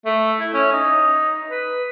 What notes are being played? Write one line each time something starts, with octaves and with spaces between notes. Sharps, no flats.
A3
E4
C#4
D#4
B4